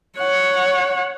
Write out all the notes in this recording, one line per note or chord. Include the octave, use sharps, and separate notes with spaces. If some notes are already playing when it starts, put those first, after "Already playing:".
C#5 F#5